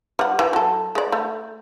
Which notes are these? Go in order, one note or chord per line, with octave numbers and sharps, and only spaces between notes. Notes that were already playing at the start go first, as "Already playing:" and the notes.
G3 F#5
E3
F#3 A4
G#3 D5
A3